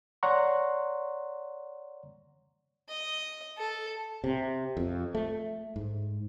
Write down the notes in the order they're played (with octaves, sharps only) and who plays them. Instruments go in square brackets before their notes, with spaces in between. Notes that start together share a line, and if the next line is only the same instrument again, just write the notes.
[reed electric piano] C#5 D5 F#5 A#5 C6 C#6
[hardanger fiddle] D#5
A4
[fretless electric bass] C3
F2
A3
G#2